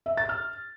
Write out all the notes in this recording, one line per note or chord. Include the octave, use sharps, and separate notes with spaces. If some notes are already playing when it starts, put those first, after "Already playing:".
E5
A6
F6